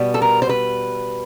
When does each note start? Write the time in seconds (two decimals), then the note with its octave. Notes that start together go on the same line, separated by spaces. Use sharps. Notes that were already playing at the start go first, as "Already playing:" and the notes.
Already playing: B2 G3 B3
0.14 A4
0.22 A#4
0.42 C5
0.49 B4